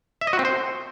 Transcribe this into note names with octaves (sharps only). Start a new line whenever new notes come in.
E5
D#5
F#4
C4
C5